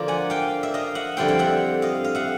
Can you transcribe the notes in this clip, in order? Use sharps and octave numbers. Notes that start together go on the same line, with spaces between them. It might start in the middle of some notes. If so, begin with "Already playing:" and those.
Already playing: D3 F3 A#3 D4 F4 A#5
F#5 G#5
F5 G5
E5
D#5 F5
E5 F#5
F2 D3 G3 C4 E4 F5 G5
G5
E5 F#5
D#5 F5
F5
E5 F#5